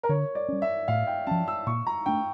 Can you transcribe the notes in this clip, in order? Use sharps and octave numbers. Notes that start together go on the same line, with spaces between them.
A#4
D3 C#5
D5
G3 C#4
E5
A2 F5
G5
F3 C#4 A5
E6
A#2 C#6
A#5
A3 D4 G5